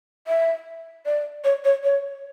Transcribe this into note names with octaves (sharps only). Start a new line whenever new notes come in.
E5
D5
C#5
C#5
C#5